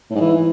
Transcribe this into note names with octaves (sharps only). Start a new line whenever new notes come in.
A2
G#2
E3